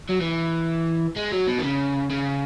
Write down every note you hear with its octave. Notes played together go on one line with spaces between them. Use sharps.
F#3
E3
G#3
F#3
B2
D#3
C#3
C#3